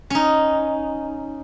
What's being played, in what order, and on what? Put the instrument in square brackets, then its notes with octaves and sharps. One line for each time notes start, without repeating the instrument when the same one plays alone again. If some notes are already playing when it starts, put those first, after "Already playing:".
[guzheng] C#4 D#4